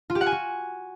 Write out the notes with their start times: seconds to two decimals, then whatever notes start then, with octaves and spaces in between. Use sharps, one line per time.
0.10 F4
0.15 G4
0.21 F#5
0.26 G#5
0.32 F#4